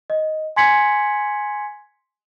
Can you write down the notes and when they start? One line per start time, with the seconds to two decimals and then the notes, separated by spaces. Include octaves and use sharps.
0.10 D#5
0.56 G#5 C6 G#6 B6 C#7 F#7